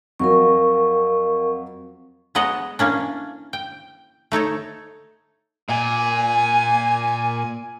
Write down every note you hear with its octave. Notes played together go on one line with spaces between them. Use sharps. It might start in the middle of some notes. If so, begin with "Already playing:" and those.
F2 F#3 A#4 F5 C#6
F#3 G#3 B3 D#5 F#5
E3 A#3 C#4 D4
G5
A3 D#4 A4 C#5
A#2 G#5